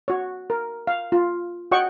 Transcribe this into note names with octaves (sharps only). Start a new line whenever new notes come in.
F#4 C#5
A#4
F5
F4
F#4 C#5 D#5 F#5 G5 C#6